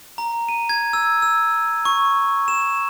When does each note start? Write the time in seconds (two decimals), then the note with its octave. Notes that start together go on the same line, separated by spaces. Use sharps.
0.18 A#5
0.49 D#7
0.69 G#6
0.93 E6
1.22 E6
1.85 C#6
2.48 E7